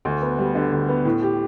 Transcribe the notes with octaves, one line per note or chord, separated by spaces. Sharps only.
D2
B3
G3
D3
D2
B3
A2
G4